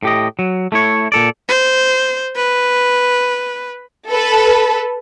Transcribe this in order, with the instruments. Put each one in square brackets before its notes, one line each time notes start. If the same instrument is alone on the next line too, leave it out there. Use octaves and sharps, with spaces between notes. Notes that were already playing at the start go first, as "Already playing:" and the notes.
[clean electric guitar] A2 G4 D#5
F#3
A3 E4 C#5
A#2 A4 D5
[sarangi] C5
B4
[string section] A4 B4